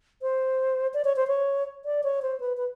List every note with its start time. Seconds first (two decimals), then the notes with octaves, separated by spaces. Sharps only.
0.22 C5
0.94 D5
1.05 C#5
1.16 C5
1.27 C#5
1.85 D5
2.04 C#5
2.22 C5
2.40 B4
2.57 B4